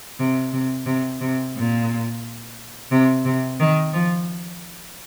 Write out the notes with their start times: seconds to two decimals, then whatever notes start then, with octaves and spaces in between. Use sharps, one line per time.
0.19 C3
0.52 C3
0.86 C3
1.20 C3
1.55 A#2
2.91 C3
3.24 C3
3.59 D#3
3.93 F3